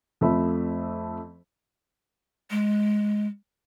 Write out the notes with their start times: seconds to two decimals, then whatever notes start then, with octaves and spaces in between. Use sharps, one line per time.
0.21 F2 F3 A3 E5 B5
2.51 G#3